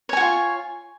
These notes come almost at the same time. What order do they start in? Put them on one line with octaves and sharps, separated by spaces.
C#5 G#5 F#4 F4